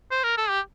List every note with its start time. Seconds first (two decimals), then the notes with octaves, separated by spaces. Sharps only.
0.11 C5
0.24 A#4
0.37 A4
0.49 G4